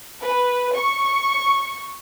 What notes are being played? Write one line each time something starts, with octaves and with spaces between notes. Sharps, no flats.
B4
C#6